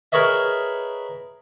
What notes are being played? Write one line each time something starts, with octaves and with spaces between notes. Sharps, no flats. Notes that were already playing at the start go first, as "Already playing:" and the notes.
G#4 A#4 B4 C#5 D#5 E5